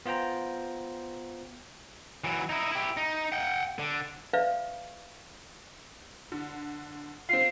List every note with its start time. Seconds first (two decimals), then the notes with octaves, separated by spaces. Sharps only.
0.06 B3 F4 C5 G5 A#5
2.24 E3 F#3
2.49 D#4 E4
2.72 E4 G4
2.97 D#4
3.32 F#5 G5
3.79 D3
4.33 B4 D5 E5 F5
6.32 D3
7.29 C4 F4 C7